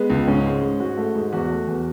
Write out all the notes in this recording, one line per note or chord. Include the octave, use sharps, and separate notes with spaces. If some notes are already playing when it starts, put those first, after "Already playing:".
Already playing: G#3 B3
C#2
G#2 C#4
G#3
G#2
G#2 F#4
A3
G#2
E2 F#4
A3
E2